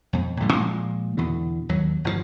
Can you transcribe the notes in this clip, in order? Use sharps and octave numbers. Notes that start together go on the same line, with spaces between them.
F2 B2
A1 A2 D3 G3
A#2 F3 G#3
E2 B2 D3
D#2 F#3
G1 G2 C#3 F3